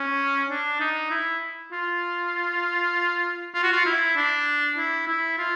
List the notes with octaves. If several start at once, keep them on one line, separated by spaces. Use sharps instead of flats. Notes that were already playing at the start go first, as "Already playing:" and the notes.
Already playing: C#4
D4
D#4
E4
F4
F4
F#4
F4
E4
D4
E4
E4
F4